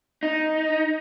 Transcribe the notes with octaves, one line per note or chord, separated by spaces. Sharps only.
D#4